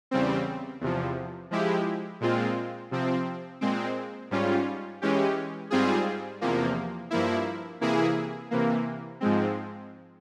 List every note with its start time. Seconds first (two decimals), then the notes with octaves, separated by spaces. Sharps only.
0.11 E2 C#3 G3 C4
0.81 E2 C3 F3
1.51 F3 G#3 E4 G4
2.21 A#2 G#3 C4 F4
2.91 C3 F3 C4
3.61 A#2 G#3 C4
4.31 G#2 G3 C#4 F4
5.02 E3 G#3 C#4 G4
5.70 G#2 G3 C4 F4 G#4
6.41 E2 C3 F3 A#3
7.10 G2 F3 A#3 E4
7.81 C3 E3 A#3 E4 G#4
8.51 C3 E3 A#3
9.20 G#2 F3 G#3 C4